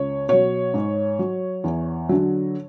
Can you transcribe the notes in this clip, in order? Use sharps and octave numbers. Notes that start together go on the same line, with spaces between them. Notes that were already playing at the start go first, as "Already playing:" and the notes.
Already playing: C#2 C#5
B2 F#3 C#5
G#2
F#3
E2
D3 F#3